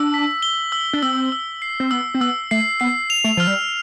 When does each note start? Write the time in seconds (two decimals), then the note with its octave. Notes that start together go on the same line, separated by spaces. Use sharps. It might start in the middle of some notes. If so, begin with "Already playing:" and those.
Already playing: D4 E6
0.14 B6
0.42 G7
0.72 E6
0.93 D4
1.02 C4 E6
1.32 E6
1.62 C7
1.80 C4
1.91 B3 E6
2.14 C4
2.21 B3 E6
2.51 A3 C7
2.80 B3 C7
3.10 F7
3.24 A3
3.37 F3 F6
3.47 G3